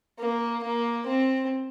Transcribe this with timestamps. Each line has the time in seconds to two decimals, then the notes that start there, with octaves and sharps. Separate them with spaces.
0.19 A#3
0.63 A#3
1.07 C4